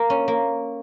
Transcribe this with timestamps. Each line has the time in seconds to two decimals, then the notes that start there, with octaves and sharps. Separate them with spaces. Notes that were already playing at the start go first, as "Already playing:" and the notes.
Already playing: A#3
0.10 C#4
0.28 A#3